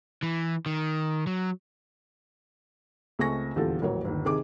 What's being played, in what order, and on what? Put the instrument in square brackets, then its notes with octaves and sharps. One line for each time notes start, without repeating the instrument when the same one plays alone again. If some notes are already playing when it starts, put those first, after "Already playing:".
[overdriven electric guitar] E3
D#3
F#3
[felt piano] C#2 A3 C4 G#5 C#6 A#6
D#1 E2 D3 F4 G4 A4
D#1 A1 F#3 A#4 C#5
G1 D#2
C3 D#3 G#4 G#5 D6